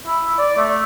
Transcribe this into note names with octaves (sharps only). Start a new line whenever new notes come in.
E4
D5
A3